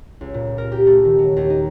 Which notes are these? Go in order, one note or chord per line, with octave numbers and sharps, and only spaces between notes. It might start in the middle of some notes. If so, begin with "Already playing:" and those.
C#2
A#2
A#4
G4
A3
D#3
F#3
D#2
D#4